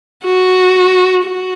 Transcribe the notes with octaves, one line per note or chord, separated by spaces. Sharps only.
F#4
F#4